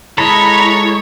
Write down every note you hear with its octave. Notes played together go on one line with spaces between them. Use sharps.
G#3 E4 A4 C#5 A#5 B5